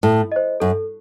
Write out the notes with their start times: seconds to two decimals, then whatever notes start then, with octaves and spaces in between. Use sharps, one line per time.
0.03 A2 A4
0.32 C5 D#5
0.60 F#2 A4